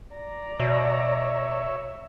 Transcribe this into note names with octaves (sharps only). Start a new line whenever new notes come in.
D5 A#5
B2 C#5 E5